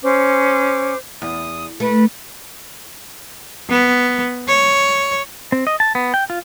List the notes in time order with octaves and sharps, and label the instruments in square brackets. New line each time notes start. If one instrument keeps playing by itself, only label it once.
[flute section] C#4 C5 D6
[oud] E2 [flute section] D#6
[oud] A3 [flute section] B4
[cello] B3
C#5
[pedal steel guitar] C4
D#5
A5
B3
G5
F4